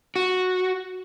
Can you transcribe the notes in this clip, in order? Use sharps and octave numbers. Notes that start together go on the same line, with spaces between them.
F#4